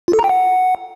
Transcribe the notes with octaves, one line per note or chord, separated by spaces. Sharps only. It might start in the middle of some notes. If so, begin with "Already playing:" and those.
F4
A4
A#5
G5
F#5